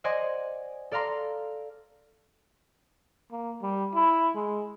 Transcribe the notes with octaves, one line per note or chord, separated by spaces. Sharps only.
C5 D5 D#5 F#5 G#5 C6
A4 D5 F5 A#5 C6
A#3
G3
E4
G#3